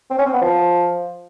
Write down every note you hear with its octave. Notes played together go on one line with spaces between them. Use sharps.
C4
C#4
C4
B3
F3